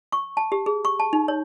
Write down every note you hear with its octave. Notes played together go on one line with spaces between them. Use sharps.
C#6
A5
G4
G#4
C#6
A5
D#4
C#5